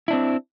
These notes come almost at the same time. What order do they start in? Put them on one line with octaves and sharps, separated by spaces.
E4 D4 C4